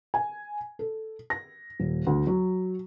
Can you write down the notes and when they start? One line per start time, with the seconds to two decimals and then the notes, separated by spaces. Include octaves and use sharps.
0.14 G#5
0.79 A4
1.30 A#6
1.80 D#1
2.07 D2
2.27 F#3